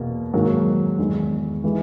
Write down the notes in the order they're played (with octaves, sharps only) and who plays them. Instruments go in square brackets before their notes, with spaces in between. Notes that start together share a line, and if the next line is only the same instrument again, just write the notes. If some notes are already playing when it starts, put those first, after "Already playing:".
Already playing: [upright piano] E2 B2 A#3
G#2 D#3 F#3 A#3
E2 D#3 G#3
E3 G#3